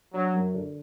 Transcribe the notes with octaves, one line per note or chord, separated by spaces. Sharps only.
F#3 D4
F#2
D3